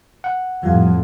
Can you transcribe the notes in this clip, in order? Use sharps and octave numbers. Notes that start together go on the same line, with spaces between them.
F#5
F2 A2 F3 G3 F5